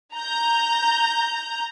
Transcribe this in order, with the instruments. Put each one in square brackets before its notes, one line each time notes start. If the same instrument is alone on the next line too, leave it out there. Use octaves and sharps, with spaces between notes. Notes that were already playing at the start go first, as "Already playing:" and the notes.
[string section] A#5 G6